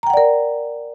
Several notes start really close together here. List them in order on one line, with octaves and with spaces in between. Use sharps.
A#5 G5 F#5 D5 A#4